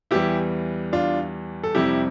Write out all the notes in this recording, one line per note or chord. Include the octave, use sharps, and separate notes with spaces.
E2 E3 G3 E4 G4
D4 F4
A4
F2 C3 G3 E4 G4